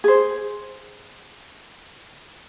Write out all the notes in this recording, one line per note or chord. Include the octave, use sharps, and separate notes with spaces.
G#4 C5